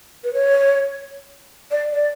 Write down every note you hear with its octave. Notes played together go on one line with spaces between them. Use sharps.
B4
C#5
D5
D5